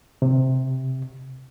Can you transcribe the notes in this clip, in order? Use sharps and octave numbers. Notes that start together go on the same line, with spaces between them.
C3